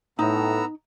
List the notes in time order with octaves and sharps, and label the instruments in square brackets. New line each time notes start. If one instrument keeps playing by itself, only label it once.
[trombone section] A2 [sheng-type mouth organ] B3 A#5 E6 [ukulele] D#4